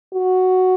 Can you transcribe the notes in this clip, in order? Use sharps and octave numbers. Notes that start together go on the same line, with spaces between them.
F#4